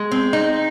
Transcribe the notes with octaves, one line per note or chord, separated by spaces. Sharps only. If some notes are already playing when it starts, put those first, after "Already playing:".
Already playing: G#3
C4
D#4